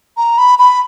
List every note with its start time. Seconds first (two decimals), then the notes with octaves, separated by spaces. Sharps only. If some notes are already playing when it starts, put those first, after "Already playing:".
0.17 A#5
0.38 B5
0.59 B5